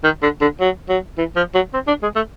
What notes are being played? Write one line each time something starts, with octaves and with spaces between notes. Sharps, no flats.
D#3
D3
D3
F#3
F#3
E3
F3
F#3
C4
D4
G#3
A3